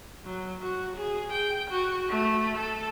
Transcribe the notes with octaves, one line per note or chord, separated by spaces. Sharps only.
F#3
F#4
G#4
G5
F#4
A3
A4